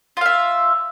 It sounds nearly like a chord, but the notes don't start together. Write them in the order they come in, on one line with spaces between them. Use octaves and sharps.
F4 F5 E5